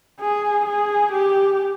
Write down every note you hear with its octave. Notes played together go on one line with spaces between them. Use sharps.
G#4
G#4
G4